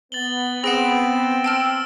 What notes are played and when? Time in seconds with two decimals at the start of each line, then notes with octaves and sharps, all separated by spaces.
0.12 B3 A6 F#7 G7
0.64 C4 G#4 F#5 A#6 D7 E7
1.44 G5 A5 E6 F6